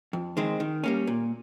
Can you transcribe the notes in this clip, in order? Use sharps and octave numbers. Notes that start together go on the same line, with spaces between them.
F2
D#3 G#3 C4
D#3
G3 A#3 C#4
A#2